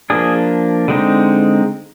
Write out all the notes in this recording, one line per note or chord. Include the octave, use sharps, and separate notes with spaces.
F3 A#3 D4 G#4
D3 G#3 C4 D#4